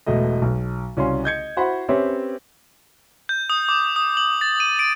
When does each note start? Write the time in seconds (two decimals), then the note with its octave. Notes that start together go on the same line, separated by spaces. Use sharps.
0.06 E1 B2 A3 D#5
0.42 B1
0.97 C2 C#3 C#4 F#4 F5 C6
1.24 D#5 G6 G#6 C#7
1.56 E4 F#4 C5 F#5 B5 C6
1.88 C4 C#4 G4 B4 C#5 E5
3.29 G6
3.50 D#6
3.69 D6
3.96 D#6
4.17 F#7
4.41 A6
4.60 D#7
4.79 D7